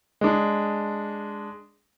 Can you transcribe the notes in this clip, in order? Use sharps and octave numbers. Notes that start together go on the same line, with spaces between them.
G#3 D4